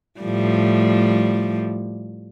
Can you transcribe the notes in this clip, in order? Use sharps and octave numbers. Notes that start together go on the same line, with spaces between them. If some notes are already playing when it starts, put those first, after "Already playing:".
A2 F3 G3